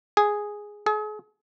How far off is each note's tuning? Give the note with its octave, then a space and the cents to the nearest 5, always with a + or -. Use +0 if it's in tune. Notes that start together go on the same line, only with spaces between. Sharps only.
G#4 +0
G#4 +40